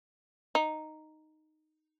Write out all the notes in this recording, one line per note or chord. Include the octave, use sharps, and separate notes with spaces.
D#4